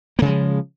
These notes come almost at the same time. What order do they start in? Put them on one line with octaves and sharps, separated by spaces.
A#3 C#3 G#3 F3